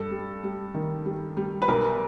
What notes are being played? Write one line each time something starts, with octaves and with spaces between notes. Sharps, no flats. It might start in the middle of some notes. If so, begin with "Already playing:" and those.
Already playing: G2 A4
G3
G3
D#3
G3
G3
B4
B1 A#4